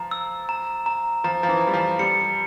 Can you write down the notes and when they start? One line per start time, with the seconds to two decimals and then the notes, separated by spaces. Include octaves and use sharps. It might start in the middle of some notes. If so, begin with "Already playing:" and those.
Already playing: F3 A#5
0.11 E6
0.49 A#5
0.86 A#5
1.24 F3 A#5
1.43 F3
1.49 E3
1.62 A#5
1.67 G3
1.74 F3
1.99 G3 C#7